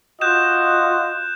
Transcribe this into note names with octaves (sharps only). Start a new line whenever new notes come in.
F4 F#4 D#5 F#6 G6 E7